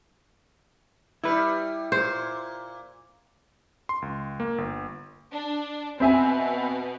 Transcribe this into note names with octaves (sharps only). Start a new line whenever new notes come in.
G3 E4 B4
A#2 C5
C6
C#2
A#3
G1
D4
B2 C4 E5 G#5